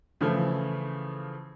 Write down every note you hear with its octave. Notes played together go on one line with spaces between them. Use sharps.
C#3 E3 F3 A3